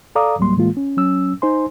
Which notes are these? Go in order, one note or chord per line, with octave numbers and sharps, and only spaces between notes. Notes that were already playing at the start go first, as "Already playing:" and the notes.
A4 D5 F5 A#5 D6 D#6
D2 A2 F#3 G3 A#3 C6
A2 E3 G#3 A#3 F4
C#4
F#3 C#4 E6
D#4 C5 G#5 C6